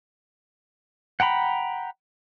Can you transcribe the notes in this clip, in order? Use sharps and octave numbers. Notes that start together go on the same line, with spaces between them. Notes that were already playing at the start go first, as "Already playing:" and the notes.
F#5 G5 A#5 B5